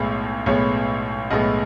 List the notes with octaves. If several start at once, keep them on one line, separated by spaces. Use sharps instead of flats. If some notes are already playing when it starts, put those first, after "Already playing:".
Already playing: B1 A2 G#3 B3
B1 A2 G#3 B3 C#5
B1 A2 G#3 B3 D#5